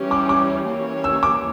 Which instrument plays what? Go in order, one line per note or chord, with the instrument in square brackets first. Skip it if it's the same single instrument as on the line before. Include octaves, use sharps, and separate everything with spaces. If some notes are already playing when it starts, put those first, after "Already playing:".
Already playing: [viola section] E3 G3 C#4 G4
[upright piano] D6
D6
[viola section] E3 A#3 C#4 G4 C#5
[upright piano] E6
D6